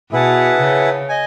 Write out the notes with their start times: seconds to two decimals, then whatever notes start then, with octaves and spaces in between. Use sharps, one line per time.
0.11 B2 E4 G#4 B4 F#5 A5
0.60 C#3
1.09 D#5 G#5